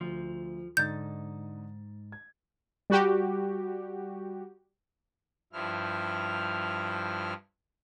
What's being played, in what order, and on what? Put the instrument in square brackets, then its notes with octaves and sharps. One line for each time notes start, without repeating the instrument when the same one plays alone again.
[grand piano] D2 [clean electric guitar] F3
[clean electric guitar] G#2 [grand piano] D3 D#4 A6 [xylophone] G6
[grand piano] G#6
[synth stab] G3 F#4 G4
[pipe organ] G2 F3 E4 F6